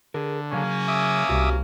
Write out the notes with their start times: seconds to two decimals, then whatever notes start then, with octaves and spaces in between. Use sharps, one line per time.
0.14 D3 G#4 A#4
0.53 C#3 F#3 A#3 C#4 G#4
0.88 E5 D6 D#6
1.29 C2 F#4 G4